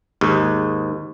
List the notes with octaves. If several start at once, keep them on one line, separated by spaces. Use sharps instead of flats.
D#2 G#2